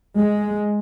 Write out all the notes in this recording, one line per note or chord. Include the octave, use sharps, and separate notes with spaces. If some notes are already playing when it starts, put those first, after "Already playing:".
G#3